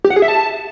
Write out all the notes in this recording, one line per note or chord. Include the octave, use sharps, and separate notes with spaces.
G4
F#5
G#4
E5
A5